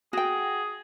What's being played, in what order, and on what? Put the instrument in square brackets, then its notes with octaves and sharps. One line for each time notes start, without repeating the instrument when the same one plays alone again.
[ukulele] F#4 G5 [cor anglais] G#4